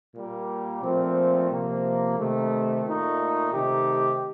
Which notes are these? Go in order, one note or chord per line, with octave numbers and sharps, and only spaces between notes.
A#2 G3 A#3
A#2 F3 A3 C4
C3 F3 A#3
C3 D#3 A3
A#2 A3 D#4
C3 D#3 A3 D#4 G4